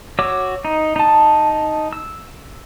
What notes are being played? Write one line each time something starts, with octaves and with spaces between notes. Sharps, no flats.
F#4 C#5 D6 E6
D#4
D#4 A5
E6